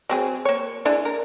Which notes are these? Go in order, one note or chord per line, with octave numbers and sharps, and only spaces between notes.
F#3 C4 G#4
A#3 C#5
D4 E4 G#4
A#4